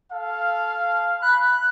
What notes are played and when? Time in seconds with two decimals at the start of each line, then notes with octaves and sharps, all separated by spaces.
0.13 A4 F5
1.22 B5 F#6